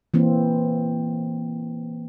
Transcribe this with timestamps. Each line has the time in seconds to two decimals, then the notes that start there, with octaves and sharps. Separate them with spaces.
0.14 E3 A#3 C4